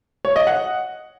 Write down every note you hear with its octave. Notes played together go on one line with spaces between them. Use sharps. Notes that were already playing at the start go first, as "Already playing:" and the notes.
C#5
D#5
F#5